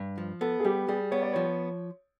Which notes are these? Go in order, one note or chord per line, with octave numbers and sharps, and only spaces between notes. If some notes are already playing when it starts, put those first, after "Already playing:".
Already playing: G2
F3
B3 A4
G#4
G3 G4
G3 G#4
B3 C#5
D5
F3 C#5